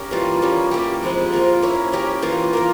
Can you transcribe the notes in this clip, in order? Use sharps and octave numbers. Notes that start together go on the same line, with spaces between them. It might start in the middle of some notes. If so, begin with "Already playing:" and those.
Already playing: C#4 G4 A#4
E3 G3 A#3 F4
G3 A#3 C#4
G3 A#3 E4 G4
C3 F3 G#3
A#3 F4 A#4
A#3 C#4 E4
A#3 C#4 G4 A#4
E3 A#3 F4
A#3 F4 A#4